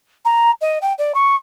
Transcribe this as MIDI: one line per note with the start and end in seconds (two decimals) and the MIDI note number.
0.25 0.51 82
0.61 0.79 75
0.82 0.93 79
0.98 1.12 74
1.15 1.36 85